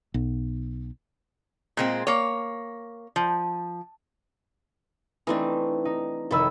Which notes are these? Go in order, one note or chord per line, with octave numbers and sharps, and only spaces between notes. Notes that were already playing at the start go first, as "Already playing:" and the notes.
B1
A#2 G#3 C4
A#3 C#5
F3
E3 A3 C4 D4 D#4
D#4
F1 D#3 A4 B5 E6